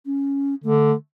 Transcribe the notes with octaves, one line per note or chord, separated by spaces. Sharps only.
C#4
D3 A3